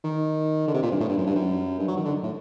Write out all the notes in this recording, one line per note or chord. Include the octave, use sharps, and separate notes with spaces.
D#3
D3
C3
A#2
G2
A2
G2
F#2
G2
F#2
G2
F#3
D#3
D3
A2